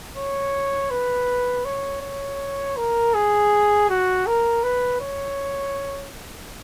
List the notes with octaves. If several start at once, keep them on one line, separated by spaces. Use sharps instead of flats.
C#5
B4
C#5
C#5
A#4
G#4
F#4
A#4
B4
C#5